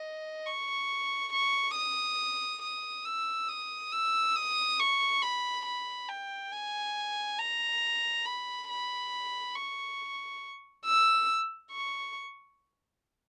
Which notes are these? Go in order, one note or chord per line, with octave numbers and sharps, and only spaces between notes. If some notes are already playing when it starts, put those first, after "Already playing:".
Already playing: D#5
C#6
C#6
D#6
D#6
E6
D#6
E6
D#6
C#6
B5
B5
G5
G#5
A#5
B5
B5
C#6
E6
C#6